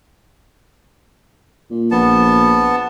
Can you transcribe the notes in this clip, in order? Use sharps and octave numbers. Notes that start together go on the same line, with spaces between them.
A#2
A#1 B3 A5